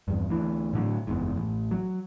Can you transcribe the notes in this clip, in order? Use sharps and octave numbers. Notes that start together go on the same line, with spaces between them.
E2 G2
D2 E3
A2 D3 F#3
F#1 E2 G#2
A1
F#3